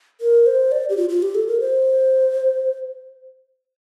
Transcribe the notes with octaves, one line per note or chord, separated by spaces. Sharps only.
A#4
C5
D5
G4
F4
F4
G4
A4
A#4
C5